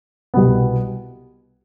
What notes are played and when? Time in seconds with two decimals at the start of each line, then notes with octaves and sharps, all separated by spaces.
0.34 C2 B2 G3 B3